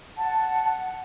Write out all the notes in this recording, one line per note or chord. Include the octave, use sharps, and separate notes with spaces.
F#5 A5